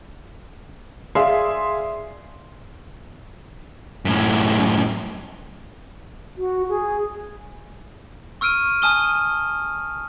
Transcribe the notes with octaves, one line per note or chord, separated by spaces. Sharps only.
G#4 D5 E5 F5 C6
F#2 A2
F#4
G#4
C#6 E6 F6 D7 D#7
G#5 A5 D#6 F6 G7